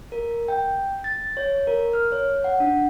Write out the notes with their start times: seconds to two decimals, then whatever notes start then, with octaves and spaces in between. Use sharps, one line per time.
0.12 A#4
0.48 G5
1.04 A6
1.37 C#5
1.67 A#4
1.93 F6
2.12 C#5
2.44 F#5
2.60 D4